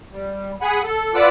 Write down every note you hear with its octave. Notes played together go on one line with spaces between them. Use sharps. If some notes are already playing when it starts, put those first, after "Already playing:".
G3
G#4 F#5 G#5 B5
A4
F4 B4 D5 F#5 D6 E6